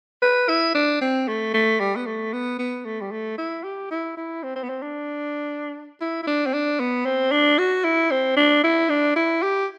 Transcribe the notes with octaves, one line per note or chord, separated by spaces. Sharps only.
B4
E4
D4
C4
A3
A3
G3
B3
A3
B3
B3
A3
G3
A3
E4
G4
E4
E4
C4
C4
B3
C4
D4
E4
E4
D4
C4
D4
B3
C4
D4
F#4
E4
C4
D4
E4
D4
E4
G4